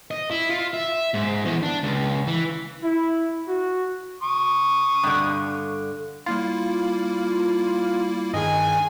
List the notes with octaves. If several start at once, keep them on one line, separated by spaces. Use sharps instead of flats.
D#5
E4
F4
E5
G#2
E2
D4
C#2
E3
E4
F#4
C#6 D#6
G2 D3
G3 A#3 E4 F4
G2 D#3 D#4 G#4 G#5